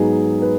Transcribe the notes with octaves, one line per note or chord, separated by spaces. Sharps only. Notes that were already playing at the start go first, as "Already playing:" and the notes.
Already playing: G#2 F#3 B3 D#4 G#4
B4